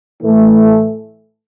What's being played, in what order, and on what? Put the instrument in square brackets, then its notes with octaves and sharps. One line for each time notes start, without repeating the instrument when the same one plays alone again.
[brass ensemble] A2 E3 A3